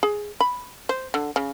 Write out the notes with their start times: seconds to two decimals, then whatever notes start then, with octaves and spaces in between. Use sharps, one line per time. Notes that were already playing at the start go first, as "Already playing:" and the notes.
0.03 G#4
0.40 B5
0.89 C5
1.14 D3
1.36 C#3